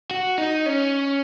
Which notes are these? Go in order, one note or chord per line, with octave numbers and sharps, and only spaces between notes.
F#4
D#4
C#4